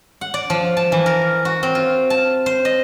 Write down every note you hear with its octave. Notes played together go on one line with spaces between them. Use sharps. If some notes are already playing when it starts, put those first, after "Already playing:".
F#5
D5
F3
A5
E3
A#4
F#4
C4
F4
A5
C5
D#5